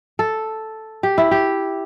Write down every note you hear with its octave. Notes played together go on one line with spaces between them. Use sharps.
A4
G4
E4
G4